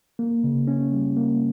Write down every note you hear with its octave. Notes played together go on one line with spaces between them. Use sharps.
A#3
C#3
C#4
G3
A#3